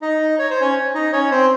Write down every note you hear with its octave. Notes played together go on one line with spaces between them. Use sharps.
D#4 D#5
C#5
C5
C#4 C#5
D#4 D#5
C#4 C#5
C4 C5